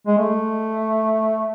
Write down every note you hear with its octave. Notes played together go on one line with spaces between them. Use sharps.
G#3
A3